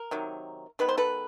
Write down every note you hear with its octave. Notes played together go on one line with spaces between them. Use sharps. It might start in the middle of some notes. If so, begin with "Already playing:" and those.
Already playing: A#4
C3 D#3 F#3
D#3 G#3 B3 B4
C5
A4 B4